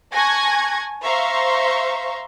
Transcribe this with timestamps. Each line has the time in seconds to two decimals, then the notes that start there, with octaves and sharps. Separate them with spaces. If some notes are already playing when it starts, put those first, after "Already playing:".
0.14 G#5 A5 C#6 F#6 G#6 A#6
1.04 C5 E5 F5 A#5 C6 C#6